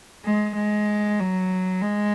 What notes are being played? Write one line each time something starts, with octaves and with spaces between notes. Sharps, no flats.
G#3
G#3
F#3
G#3